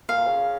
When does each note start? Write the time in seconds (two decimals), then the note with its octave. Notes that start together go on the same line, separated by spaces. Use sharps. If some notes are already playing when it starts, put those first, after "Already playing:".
0.09 A#2 F5
0.26 C#3